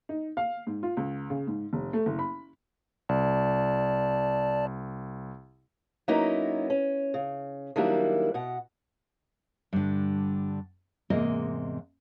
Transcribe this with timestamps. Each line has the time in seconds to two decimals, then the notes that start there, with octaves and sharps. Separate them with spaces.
0.09 D#4
0.37 F5
0.67 G#2
0.83 F4
0.97 C#2
1.30 C#3
1.47 G#2
1.73 F1
1.93 A3
2.06 F#1
2.19 B5
3.09 C2 D5 A5
6.08 F#3 A#3 B3 C#4 D#4 E4
6.70 C#4
7.14 C#3
7.76 D#3 F#3 G3 A#3 D4 E4
8.34 B2 F#5
9.73 G2 D3
11.10 E2 G#2 C3 A#3 A#4 D#5